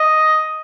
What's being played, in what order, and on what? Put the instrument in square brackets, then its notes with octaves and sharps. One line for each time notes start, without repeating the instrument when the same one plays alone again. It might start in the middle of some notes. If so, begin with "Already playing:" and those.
Already playing: [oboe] D#5